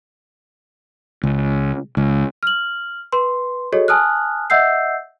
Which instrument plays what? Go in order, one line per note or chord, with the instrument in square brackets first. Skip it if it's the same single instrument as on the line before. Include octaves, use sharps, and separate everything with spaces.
[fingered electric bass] C#2
C#2
[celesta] F6 F#7
B4 C6
F#4 G#4 A4 C#5 D#5
G#5 A5 D#6 F6 F#6
D#5 E5 F#5 E6 G6 C7